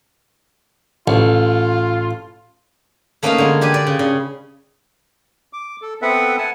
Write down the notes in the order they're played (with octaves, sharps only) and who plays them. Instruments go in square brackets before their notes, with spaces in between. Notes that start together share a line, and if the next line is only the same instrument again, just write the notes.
[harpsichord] A1 [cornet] F4
[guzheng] A3 A#3 C#4 D#4 B4 F5
D3 G#3
D4 G4 B4 G#5
D5
C#3
C#3
[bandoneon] D6
A4
B3 C4 A4 B4 E5 F#5
F#5 G#5 A5